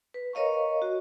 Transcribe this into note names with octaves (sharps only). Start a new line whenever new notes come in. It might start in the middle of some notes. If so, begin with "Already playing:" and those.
B4
A#4 C#5 D#5 F5 A#5 C#6
F#4